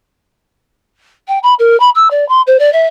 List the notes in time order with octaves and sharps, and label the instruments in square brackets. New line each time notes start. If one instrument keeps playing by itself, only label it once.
[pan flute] G5
B5
A#4
B5
E6
D5
C6
C5
D5
E5